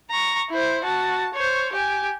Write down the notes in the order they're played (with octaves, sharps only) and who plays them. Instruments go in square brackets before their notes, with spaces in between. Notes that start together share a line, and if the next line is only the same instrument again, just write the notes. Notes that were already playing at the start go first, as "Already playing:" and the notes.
[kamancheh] A#5 C#6
E4 C5
F#4 A5
C5 C#5
G4 G#5